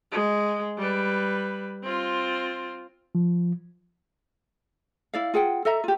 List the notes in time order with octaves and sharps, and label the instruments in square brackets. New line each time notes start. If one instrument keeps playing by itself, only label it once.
[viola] G#3
G3 B4
C4 F4
[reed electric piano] F3
[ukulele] E4 D5 F5
F4 G#4 F#5 G5
A4 D#5 E5 A#5
F4 G4